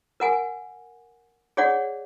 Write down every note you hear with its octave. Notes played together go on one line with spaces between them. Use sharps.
A#4 F#5 G#5
G#4 C#5 D5 F#5